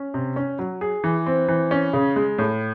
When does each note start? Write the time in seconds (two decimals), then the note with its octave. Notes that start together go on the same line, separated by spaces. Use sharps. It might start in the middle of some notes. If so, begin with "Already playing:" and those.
Already playing: C#4
0.14 C3
0.36 C#4
0.59 F#3
0.81 G#4
1.04 E3
1.26 C4
1.48 E3
1.71 C#4
1.93 C#3
2.16 G#3
2.39 A2